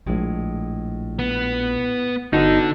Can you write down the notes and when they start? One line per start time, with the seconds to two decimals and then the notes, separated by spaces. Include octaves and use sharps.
0.06 A#1 A2 G#3
1.19 B3
2.33 G1 D3 B3 D#4 F#4 A4